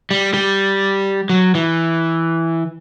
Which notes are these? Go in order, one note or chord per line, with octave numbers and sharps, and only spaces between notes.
G3
G3
F#3
E3